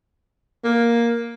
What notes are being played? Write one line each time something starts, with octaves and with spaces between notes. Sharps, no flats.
A#3